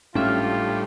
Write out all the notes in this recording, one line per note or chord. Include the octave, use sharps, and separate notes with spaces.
G#1 A2 G3 C#4 D4 F4 E5 F6